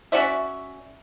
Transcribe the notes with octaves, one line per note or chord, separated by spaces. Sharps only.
C#4 F#4 D5 E5